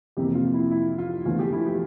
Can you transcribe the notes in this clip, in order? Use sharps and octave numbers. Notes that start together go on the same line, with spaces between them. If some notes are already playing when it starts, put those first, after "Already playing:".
F2 C3 E3 A#3 G4
F4
E4
E4
F4
E2 D3 F3 A3 F4
G4
E4
G4